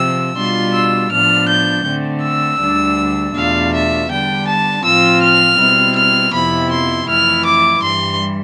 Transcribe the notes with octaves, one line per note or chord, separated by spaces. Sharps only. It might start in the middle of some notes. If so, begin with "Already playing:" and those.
Already playing: C3 F3 C4 E6
B2 G3 D4 F4 C6
E6
A2 F3 B3 D4 F6
G6
D3 A3 C4
E6
D2 D3 G3 D4
E2 B2 A3 D4 F4 F5
E5
D3 G3 B3 D4 G5
A5
A2 F3 C4 F4 E6
F6
B2 G3 C4 E4
F6
F2 C3 F3 B3 E4 B5
C6
F2 E3 A3 E4 F6
D6
G2 E3 G3 C6